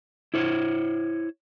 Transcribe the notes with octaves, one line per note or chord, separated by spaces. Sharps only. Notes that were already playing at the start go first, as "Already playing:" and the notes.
E4 C5 C#5